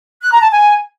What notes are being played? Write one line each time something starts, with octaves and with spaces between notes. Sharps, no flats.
F#6
A#5
A5
G#5